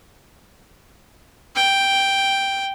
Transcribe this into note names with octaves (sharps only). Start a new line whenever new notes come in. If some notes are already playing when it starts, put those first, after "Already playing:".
G5